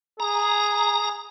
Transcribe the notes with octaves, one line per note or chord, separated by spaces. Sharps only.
G#4 A#5